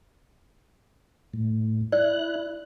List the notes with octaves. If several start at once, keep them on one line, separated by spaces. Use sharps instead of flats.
A2
E4 D5 F#6